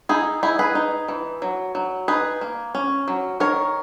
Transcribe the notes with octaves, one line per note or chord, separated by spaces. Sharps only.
D#4 E4 G#4
D#4 E4 G#4
G#4 B4
D#4
E3
F#3
F#3
D#4 G#4 B4
A#3
C#4
F#3
D#3 A#4 C#5